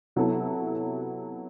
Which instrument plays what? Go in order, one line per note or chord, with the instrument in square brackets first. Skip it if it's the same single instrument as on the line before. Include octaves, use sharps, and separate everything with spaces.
[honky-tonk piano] C3 F#3 B3 E4 A4